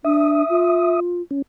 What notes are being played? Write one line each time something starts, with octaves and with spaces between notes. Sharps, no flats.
D4 E5 D#6
F4
C#4